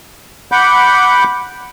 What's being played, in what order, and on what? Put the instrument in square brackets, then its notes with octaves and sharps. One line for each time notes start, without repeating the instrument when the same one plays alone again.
[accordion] F#5 B5 D6 G6